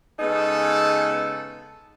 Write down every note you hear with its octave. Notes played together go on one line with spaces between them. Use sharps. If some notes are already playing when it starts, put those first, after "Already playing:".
C#3 G#3 B3 D#4 G#4 A4